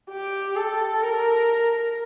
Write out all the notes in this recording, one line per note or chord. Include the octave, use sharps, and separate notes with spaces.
G4
A4
A#4